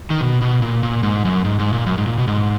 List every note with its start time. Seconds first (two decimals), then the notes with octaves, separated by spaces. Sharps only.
0.10 D#3
0.21 B2
0.41 B2
0.62 A#2
0.83 A#2
1.03 G#2
1.25 F#2
1.44 G#2
1.59 G#2
1.73 A#2
1.86 F#2
1.98 G#2
2.07 A#2
2.18 B2
2.27 G#2